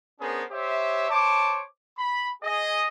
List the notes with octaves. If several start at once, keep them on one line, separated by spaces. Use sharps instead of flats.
B3 C#4 D4 G#4 A#4 C5
G4 C5 C#5 E5
C5 C#5 A5 D6
B5
G#4 D#5